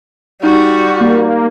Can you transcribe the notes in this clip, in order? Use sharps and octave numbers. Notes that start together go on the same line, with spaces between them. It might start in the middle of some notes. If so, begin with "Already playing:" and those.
G3 D#4 F#4
A#3